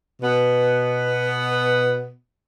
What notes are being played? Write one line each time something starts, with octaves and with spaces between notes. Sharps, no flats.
B2 B3